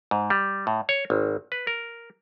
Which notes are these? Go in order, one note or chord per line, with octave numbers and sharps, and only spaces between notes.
G#2
G3
A2
C#5
G#1
B4
A#4